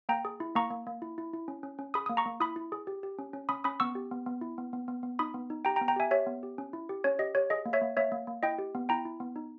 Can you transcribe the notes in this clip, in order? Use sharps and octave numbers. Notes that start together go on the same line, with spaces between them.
A#3 G5 A#5
G#4
E4
A#3 A#5 C#6
A#3
A#3
E4
E4
E4
C#4
C#4
C#4
G#4 B5 D#6
A#3 D#6
A#5 C#6
A#3
E4 B5 D#6
E4
G#4
G4
G4
C#4
C#4
C#4 B5 D#6
C#4 B5 D#6
B3 C#6 E6
G4
B3
B3
E4
B3
B3
B3
B3
D#4 B5 D#6
B3
D#4
G4 G5 A#5
G5 A#5
B3
G5 A#5
G4 E5 G#5
G4 C#5 E5
B3
G4
C#4
E4
G4
C#4 C#5
G4 D#5
G4 C#5
G#4 D#5
A#3
C#5 E5
A#3
A#3 C#5 E5
A#3
A#3
E4 D#5 G5
G4
B3
E4 G5 A#5
E4
B3
D#4